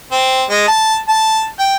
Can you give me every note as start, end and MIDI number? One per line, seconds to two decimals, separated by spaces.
0.11 0.43 60
0.50 0.67 56
0.68 0.95 81
1.09 1.43 81
1.59 1.76 79